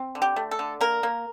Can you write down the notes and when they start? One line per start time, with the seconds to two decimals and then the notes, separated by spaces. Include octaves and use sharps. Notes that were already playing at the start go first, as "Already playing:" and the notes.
Already playing: C4
0.15 D3
0.22 G4
0.36 A3
0.51 A4
0.59 D3
0.81 A#3 A#4
1.03 A#3